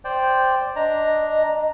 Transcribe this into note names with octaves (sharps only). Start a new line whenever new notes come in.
C5 D5 G5
D4 D#5 A#5